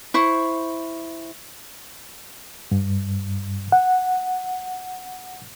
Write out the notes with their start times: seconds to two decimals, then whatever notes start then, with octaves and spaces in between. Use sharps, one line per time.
0.14 E4 C5 C#6
2.71 G2
3.72 F#5